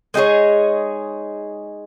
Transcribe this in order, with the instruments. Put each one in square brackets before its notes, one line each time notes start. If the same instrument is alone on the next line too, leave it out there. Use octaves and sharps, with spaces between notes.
[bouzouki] G#3 D#4 G#4 C#5